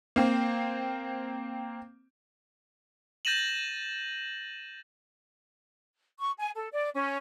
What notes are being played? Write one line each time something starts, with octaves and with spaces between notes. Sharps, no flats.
A#3 C4
G6 A6 A#6 D#7 E7 F#7
C#6
G#5
A4
D5
C#4